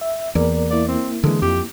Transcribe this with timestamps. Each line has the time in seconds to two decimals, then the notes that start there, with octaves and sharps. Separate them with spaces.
0.01 E5
0.35 E2 A#3 A#4 D5
0.71 A#3 E4 D5
0.88 C4
1.24 D3 E3 G#3
1.42 F2 G4